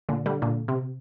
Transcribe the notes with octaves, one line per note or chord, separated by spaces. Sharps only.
A#2 D3
D3 G3
A#2 D3
C3